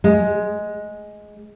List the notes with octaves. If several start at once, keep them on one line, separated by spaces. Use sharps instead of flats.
G#3